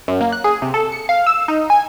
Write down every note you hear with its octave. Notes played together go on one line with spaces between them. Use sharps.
F#2
A#3
F#6
G#4
C3
A4
C#7
F5
E6
D#4
G#5